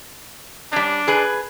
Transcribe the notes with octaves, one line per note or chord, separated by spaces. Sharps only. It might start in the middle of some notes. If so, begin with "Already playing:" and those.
G3 C#4 D4
G#4 B4